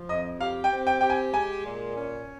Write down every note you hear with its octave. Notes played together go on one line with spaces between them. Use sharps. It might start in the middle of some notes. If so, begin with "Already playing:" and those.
Already playing: F3
F2 D#5
G4 F5
G5
C4
G5
G4 G5
G#5
G#3 G#5
A#2
C#4